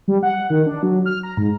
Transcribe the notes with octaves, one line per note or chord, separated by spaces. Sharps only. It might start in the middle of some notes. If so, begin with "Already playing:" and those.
G3
F#5
D#3
D4
F#3
F6
A#5
G#2